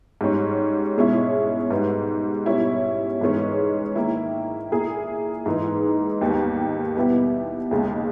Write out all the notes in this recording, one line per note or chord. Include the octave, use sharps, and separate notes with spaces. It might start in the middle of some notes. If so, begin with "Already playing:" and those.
G#2 G3 C#4
B2 G#3 C#4 E4
G#2 G3 B3
B2 G3 C#4 E4
G#2 E3 G#3 C#4
D#3 A#3 E4
A#2 A#3 E4 G#4
G#2 E3 G#3 D#4
D#2 D#3 G3 B3
B2 G3 B3 E4 G4
D#2 C#3 G#3